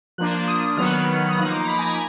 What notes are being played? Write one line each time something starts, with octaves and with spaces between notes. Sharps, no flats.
F3 A#3 D4 F#6
D#6
D#3 F#3 B3 F6
F#6
F6
F6
D#6
F3 A#3 D#4 F6
D6
A#5
B5
G#5
A#5